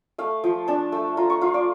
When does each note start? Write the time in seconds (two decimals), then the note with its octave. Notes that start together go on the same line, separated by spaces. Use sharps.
0.18 A3 F5
0.44 F3
0.68 D4 A5
0.92 A3
1.17 F4 A#5
1.30 C#6
1.41 F4 F5
1.54 D5